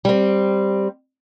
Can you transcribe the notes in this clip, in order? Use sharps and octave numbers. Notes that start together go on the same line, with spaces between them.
G3 C4